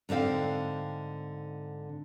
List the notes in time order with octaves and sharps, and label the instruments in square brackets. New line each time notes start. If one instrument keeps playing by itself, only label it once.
[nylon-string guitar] G#2 D3 C4 F5 G5